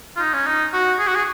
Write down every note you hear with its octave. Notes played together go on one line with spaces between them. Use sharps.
F4
D#4
C#4
D#4
F#4
G#4
F#4
G#4